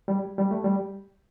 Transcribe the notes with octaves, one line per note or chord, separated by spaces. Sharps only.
G3
G3
A3
G3